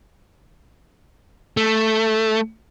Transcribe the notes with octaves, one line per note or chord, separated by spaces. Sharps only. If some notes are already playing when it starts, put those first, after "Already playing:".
A3